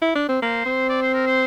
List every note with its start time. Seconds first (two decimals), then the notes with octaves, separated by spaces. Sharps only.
0.02 E4
0.15 D4
0.29 C4
0.42 A#3 C5
0.65 C4
0.89 D5
1.02 C5
1.14 A#4
1.27 C5